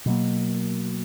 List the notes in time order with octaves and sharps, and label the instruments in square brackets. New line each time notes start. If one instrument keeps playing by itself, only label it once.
[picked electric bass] B2 F#3 A#3